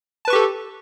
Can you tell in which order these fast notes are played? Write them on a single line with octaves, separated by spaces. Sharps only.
A5 B4 C#6 G4 A4